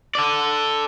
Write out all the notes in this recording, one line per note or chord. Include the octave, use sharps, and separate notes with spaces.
A4 D5